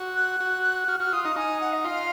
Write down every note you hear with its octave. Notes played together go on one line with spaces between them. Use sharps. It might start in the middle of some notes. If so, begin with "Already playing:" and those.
Already playing: F#4
F#6
F#4
F#4 F6
F#4 F6
F4 D#6
D#4 D#6
D#4 G#5
F#5
D#5
F4 F5